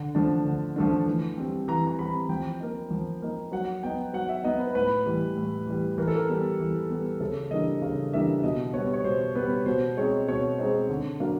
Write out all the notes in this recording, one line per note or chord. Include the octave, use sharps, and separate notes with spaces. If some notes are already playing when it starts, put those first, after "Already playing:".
Already playing: D3
F3 A3 D4 A5
D3
F3 A3 D4
E3
G3 C4
E3 A#5
A#5
G3 C4 B5
F3 G5
A#3 D#4
F3
A#3 D#4
F#3 F#5
B3 D#4 G5
F#3 F#5
E5
B3 D#4 D#5
B4
A2 B4
E3 G3
A2
E3 G3
E3 A#4
A4
A#4
G3 B3
E3
G3 B3
C#3 A4
E3 G3 A#3 D4 D#5
C#3 F5
E3 G3 A#3 D4 E5
B2 D#5
G3 B3 C#5
C#5
B2 C5
G3 B3 B4
B2 C5
G#3 C4 D#4 C#5
B2 C#5
G#3 C4 D#4 C5
D3
F#3 A#3 D4 F5